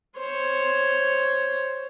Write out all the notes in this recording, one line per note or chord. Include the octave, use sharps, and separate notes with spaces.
C5 C#5